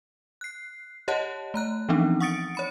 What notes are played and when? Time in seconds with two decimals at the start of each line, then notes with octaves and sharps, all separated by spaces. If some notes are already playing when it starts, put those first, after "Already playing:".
0.41 F#6 C7
1.08 G4 C#5 D#5 F#5 A5 F#6
1.54 A3 A#5 F#6
1.89 E3 F3 B3 C4 D4 D#4
2.20 F#5 C#6 D#6 A6 C#7 D7
2.55 C#5 B5 C#7